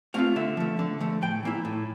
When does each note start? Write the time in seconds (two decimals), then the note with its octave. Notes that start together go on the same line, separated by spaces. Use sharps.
0.14 A3 C4 F4 F5
0.36 D3 E5
0.57 F3 A3
0.79 D3
1.00 F3 A3
1.22 A2 G5
1.43 E3 A#3 E4
1.65 A2